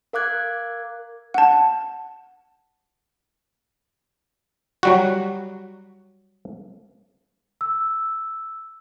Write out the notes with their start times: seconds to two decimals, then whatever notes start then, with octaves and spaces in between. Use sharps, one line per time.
0.13 A#4 F5 D6 F#6 G#6
1.34 F#5 A5
4.83 F#3 G3 F#4
7.61 E6